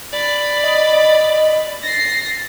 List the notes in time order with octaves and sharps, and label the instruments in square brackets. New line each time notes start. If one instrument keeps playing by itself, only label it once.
[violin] D5 B5
[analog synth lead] D#5
[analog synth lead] A6 [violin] A#6 C7